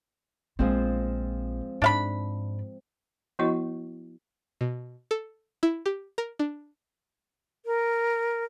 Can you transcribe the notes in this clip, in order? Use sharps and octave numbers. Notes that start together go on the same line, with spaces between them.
A#1 F3 G#3 C4 F4
G#2 D4 F5 B5
F3 B3 E4 F#4 D#5 C#6
B2
A4
E4
G4
A#4
D4
A#4